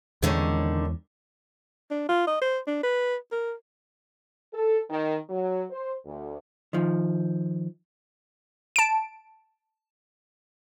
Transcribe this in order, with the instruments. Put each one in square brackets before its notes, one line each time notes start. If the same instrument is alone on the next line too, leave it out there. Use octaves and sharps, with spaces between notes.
[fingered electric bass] E2 [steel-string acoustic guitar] A#2 D3 D#3 [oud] G#3 C#4
[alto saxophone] D4
F4
D#5
C5
D4
B4
A#4
[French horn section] A4
D#3
F#3
C5
D2
[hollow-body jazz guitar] D#3 F3
[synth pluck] A5 D7